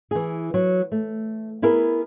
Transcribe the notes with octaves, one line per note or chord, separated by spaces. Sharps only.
E3 G#4
F#3
A3
B3 E4 G#4 A#4